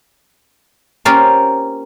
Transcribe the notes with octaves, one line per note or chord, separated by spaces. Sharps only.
A#3 C#4 F4 G4 A#4 C5